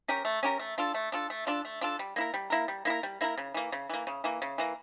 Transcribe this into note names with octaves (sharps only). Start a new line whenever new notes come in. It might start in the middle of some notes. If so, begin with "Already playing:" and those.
C#4 G4 A#4
A3
C#4 G4 A#4
A3
D4 F4 A4
A3
D4 F4 A4
A3
D4 F4 A4
A3
D4 F4 A4
G3
A#3 E4 A#4
G3
A#3 E4 A#4
G3
A#3 E4 A#4
G3
A#3 E4 A#4
C#3
E3 A#3
C#3
E3 A#3
C#3
E3 A#3
C#3
E3 A#3